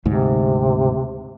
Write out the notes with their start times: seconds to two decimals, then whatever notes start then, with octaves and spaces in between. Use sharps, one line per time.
0.06 D2 G#2 C3